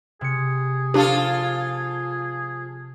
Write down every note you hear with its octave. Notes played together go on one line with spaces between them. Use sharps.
C3 G#4 C#7
F3 D4 F4 G4 A4